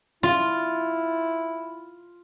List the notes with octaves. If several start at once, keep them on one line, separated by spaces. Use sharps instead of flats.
E4 F4